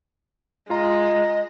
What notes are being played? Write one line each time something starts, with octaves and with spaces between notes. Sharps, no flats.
G#3 F4 D#5 A#5